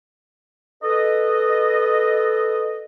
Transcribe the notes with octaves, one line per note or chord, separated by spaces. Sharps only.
A4 B4 D#5